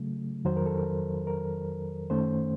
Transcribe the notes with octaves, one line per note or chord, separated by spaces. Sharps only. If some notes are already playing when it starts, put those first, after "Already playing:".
Already playing: C#3 F#3 A3
F2 D#3 F#3 C5
A#4
A4
A#4
A#4
F#2 D#3 A3 C#4 C5